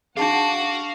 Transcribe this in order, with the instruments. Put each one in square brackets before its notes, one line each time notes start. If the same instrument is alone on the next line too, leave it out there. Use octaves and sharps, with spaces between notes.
[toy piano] D4 D#4 G#4 [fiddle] F#4 [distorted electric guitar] F5 [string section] F#5 A5 D6